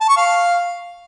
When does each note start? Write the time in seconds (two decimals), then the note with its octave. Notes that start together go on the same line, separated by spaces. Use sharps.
0.01 A5
0.09 C#6
0.17 F5